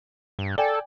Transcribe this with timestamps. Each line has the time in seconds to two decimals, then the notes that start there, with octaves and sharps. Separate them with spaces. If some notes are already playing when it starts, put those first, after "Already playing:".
0.39 G2
0.58 A4 D5 G5 G#5